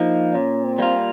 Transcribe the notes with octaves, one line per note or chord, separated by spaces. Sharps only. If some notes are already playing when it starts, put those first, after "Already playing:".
Already playing: F3 A#3 D#4
A#2 C#4
C4
G3 A#3 F4